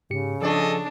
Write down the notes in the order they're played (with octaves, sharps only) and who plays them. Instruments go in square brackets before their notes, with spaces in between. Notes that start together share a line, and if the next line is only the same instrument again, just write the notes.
[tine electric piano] G#2 G4 C#7 [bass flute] C#3
[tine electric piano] F3 C#6 [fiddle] D4 [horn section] G#4 A4 D#5